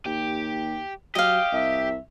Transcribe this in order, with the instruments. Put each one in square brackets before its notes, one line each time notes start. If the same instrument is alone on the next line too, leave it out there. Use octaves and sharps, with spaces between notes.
[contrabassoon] D#2 [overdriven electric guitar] G4
[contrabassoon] F#3 [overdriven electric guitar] G4 [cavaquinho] D#5 F5
[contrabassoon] C2 [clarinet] E5